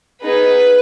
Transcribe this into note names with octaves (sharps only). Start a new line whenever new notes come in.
B3 D#4 G#4 B4